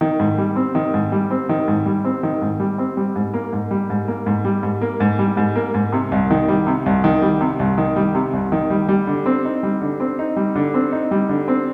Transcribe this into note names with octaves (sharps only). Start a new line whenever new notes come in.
D#3
G#2
G3
C4
D#3
G#2
G3
C4
D#3
G#2
G3
C4
D#3
G#2
G3
C4
G3
G#2
A#3
G#2
G3
G#2
A#3
G#2
G3
G#2
A#3
G#2
G3
G#2
A#3
G#2
C3
C2
D#3
G3
C3
C2
D#3
G3
C3
C2
D#3
G3
C3
C2
D#3
G3
G3
D3
C4
D#4
G3
D3
C4
D#4
G3
D3
C4
D#4
G3
D3
C4